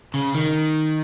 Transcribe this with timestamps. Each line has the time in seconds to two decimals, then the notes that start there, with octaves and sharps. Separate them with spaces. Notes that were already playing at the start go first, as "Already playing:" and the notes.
0.14 C#3
0.35 D#3